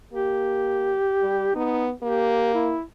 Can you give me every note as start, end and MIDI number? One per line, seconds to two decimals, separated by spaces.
0.13 0.99 58
0.13 1.52 67
1.22 1.48 55
1.56 1.92 59
1.56 1.86 63
2.02 2.73 58
2.02 2.53 67
2.54 2.82 64